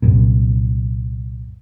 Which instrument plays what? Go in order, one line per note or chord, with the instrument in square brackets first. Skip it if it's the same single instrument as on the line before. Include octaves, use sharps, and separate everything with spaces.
[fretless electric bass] C2 F#2 A#2